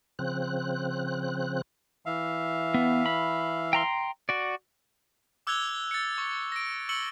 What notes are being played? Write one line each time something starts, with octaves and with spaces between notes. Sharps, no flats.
C#3 F3 C4 F#6
E3 E5 F5
B3
B5
G5 A#5 C6
F#4 D5
D6 E6 F#6 G#6 F7 G7
A6 C#7
C#6
A#6 D7
C#6 E6 C#7 F#7 G7